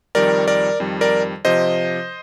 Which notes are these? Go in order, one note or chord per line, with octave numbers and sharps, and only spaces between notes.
F2 D#3 G3 A#4 D5
A#4 D5
F2 D#3 G3
A#4 D5
C3 F3 C5 D#5